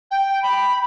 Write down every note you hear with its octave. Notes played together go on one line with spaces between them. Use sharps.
G5
B5